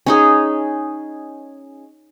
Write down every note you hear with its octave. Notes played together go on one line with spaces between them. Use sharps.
C#4 D#4 G#4